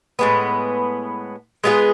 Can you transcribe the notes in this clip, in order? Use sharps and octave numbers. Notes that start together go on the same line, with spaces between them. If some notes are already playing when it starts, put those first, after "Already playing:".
A2 G#3 B3
G#3 B3 F4 G#4